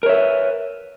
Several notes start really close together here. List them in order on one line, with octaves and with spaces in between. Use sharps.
A#4 C#5 E5 B4